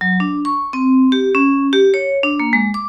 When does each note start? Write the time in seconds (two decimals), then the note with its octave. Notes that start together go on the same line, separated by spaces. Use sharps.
0.01 F#3
0.20 D4
0.45 C#6
0.73 C4
1.12 G4
1.35 C#4
1.73 G4
1.94 C#5
2.23 D4
2.40 A#3
2.53 G#3
2.74 D6